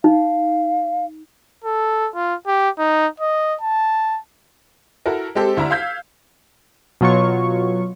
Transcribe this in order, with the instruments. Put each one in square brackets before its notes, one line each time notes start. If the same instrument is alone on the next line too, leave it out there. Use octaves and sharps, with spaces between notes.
[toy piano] D#4 [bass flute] F5
[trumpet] A4
F4
G4
D#4
D#5
A5
[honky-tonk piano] E4 F#4 A4 A#4
G#3 C4 G4 A4 C5
D2 E4 D5 E5 A#5
F5 E6 G6 G#6 B6
[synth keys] B2 F#3 F4 C#5 C#6